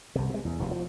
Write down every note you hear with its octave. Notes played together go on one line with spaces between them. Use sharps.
C2 C3
C3 G#3
E2
F1 D#2 A#2
F3